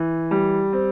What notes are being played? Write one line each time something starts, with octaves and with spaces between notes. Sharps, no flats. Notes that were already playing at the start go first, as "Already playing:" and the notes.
Already playing: E3
G3
C4